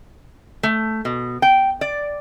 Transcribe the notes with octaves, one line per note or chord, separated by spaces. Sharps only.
A3
B2
G5
D5